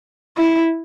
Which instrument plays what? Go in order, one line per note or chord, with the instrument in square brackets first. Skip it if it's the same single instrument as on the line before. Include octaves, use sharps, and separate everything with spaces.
[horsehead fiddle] E4